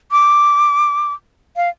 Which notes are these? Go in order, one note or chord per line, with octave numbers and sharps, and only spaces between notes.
D6
F5